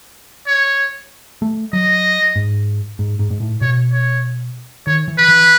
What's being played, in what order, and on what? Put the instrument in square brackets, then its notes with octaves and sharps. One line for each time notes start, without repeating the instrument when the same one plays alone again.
[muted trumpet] C#5
[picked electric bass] A3
[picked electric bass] F#3 [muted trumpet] D#5
[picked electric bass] G#2
G#2
G#2
G#2
A2
[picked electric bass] B2 [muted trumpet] C#5
[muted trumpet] C#5
[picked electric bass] D#3 [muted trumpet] C#5
[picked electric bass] E3
[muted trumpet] B4
[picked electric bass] E3